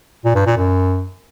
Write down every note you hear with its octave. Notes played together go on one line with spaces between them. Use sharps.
A#2
G2
A#2
F#2